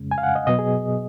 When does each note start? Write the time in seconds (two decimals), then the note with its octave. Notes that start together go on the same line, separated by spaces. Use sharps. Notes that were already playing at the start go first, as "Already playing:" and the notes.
Already playing: F2 C#3 G#3 C#4
0.11 G#5
0.18 F5
0.23 F#5
0.35 D#5
0.47 B2 F#3 B3 D#5
0.59 G#4